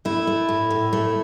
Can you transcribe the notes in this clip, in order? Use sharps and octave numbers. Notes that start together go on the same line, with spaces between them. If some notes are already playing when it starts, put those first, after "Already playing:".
A3 E4
A3
A2
A2
A3